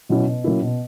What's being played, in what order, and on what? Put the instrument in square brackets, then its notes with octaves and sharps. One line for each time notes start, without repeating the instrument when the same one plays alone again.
[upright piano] B2 F#3 C#4 E4
B2
F#3 A#3 C#4 E4
B2